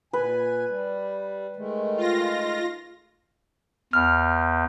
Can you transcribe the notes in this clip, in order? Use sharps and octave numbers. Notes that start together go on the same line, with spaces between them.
A#2 B4 G#5
G3
D#3 G#3 A3
F4 A#6
E2 F6